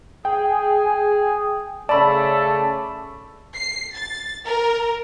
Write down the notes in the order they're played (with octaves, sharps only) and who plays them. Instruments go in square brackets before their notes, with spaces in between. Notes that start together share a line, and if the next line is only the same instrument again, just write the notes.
[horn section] G#4 [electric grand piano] G5
[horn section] C#3 A3 A4 [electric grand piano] D5 [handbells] A5 B5
[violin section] C7
A6
A#4